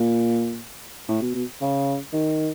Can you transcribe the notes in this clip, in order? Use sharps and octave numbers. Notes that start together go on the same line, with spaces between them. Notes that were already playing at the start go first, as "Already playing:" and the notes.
Already playing: A#2
A2
B2
B2
C#3
D#3